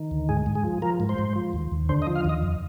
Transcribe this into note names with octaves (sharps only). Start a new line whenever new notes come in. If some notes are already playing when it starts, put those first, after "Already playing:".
Already playing: D#3
D2
G#2 G#4
G#2
G#4
F3
F3 A#4
G#2
C5
G#2
F3
D#2
D#2
D3 C5
D#5
F3
F5
D#2 D#5
F2